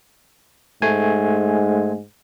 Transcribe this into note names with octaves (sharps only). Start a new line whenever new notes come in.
G#2 A3 G#5